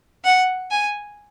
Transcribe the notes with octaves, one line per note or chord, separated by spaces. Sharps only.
F#5
G#5